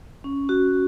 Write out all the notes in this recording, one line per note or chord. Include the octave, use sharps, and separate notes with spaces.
C#4
F#4